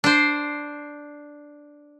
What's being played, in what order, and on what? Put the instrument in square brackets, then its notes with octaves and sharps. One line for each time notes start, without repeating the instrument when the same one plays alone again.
[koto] D4 C5